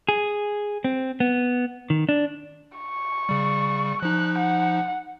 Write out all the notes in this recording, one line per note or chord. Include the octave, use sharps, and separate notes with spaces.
G#4
C4
B3
D#3
D4
C#6
C#3 G3
F3 D#4 F#6
F#5